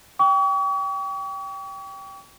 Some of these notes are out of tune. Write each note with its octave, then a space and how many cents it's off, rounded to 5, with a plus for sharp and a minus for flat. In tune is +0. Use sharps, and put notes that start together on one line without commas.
G5 +0 C#6 +40